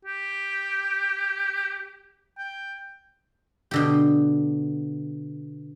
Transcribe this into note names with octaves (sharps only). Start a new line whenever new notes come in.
G4
G5
B2 D3 G4